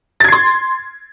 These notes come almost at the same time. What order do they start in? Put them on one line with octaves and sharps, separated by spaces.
A6 G#6 C7 C6